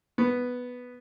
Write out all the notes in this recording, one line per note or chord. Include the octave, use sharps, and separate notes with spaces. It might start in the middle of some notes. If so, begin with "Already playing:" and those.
B3